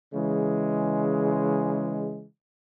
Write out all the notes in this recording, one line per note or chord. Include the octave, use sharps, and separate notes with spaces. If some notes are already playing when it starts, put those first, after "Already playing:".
C#3 E3 G#3